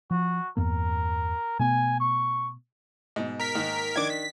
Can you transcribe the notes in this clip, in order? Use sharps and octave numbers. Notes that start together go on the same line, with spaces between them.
F3 F#4
E2 G2 A#3 A#4
B2 A3 B3 G#5
C#6
G#2 B2
A#4 B6
G#2 D#3 A#3
D#3 D4 D6 G#6
B6